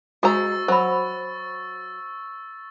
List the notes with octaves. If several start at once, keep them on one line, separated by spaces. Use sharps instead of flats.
G#3 F#4 C5 A#5 C#6 E6 A6
F#3 C5 B5